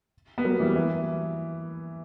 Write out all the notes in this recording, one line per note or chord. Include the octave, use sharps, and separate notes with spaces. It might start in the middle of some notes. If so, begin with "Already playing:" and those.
B3
F#3 A#3
E3 G3
E3